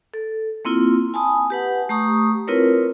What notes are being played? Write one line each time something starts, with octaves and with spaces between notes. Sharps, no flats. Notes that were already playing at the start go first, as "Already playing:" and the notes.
A4
A#3 C4 E4 F4
G#5 A5 B5 D#6
G4 B4 F#5
A3 G4 A#5 C#6 D#6
C4 E4 F4 A#4 B4 C#5